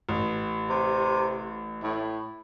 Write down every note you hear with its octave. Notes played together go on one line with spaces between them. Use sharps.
A1
C3
A2